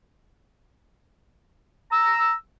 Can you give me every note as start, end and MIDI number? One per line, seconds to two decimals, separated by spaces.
1.92 2.32 82
1.92 2.32 88